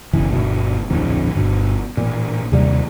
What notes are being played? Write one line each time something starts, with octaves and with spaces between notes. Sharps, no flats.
F#1 B1 E3
G1 B2 A3
D1 A#1 F2
G1 B2
A1 A#2
D#2 C3 G3 A#3